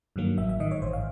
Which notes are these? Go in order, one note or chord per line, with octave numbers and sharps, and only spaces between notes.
G2 D#3 F#3 A#3
A1 E5
E5
G#2 D#3 D#5
C#5
A1 C5
F5